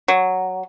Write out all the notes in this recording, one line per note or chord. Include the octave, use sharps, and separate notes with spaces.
F#3